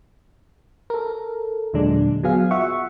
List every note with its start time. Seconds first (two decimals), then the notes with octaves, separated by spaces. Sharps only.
0.90 A4 A#4
1.74 D#2 A#2 D3 F#3 G#3 D4
2.23 F#3 B3 G#4 F5
2.51 F4 E5 F#5 C#6